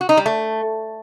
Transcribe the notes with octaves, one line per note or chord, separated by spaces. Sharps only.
F#4
D#4
G3
A3